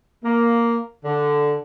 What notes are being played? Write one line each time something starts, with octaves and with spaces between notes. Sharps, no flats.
A#3
D3